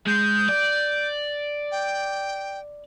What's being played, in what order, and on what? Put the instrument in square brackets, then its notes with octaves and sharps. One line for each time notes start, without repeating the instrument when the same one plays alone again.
[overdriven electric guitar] G#3 [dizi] G6
[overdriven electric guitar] D5
[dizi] G5